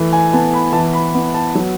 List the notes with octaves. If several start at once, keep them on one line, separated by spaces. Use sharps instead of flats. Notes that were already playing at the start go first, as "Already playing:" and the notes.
Already playing: E3 A3
G#5
B3 A5
B5
E3 A5
B5
B3
A5
F#3